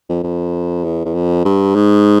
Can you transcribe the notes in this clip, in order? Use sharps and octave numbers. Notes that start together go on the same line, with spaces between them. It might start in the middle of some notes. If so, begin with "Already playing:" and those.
F2
F2
E2
E2
F2
G2
G#2